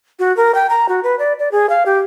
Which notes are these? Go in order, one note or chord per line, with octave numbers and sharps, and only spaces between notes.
F#4
A#4
G5
A#5
F#4
B4
D5
D5
G#4
F5
G4